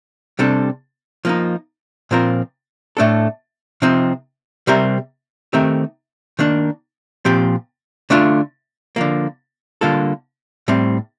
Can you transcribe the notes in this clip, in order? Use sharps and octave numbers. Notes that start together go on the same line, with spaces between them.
C3 G3 D4 A4
F3 A#3 D#4
A#2 F3 C4 F4 A#4
A2 A3 D4 A4
C3 F3 C4 D#4
C3 G3 C4 G4 A#4
D#3 A3 C4 G4 A#4
D#3 A#3 D4
A#2 F3 C4 G4
D3 A3 D4 F4
D3 F3 A#3
D3 G3 A#3 F4 A4
A2 G3 C4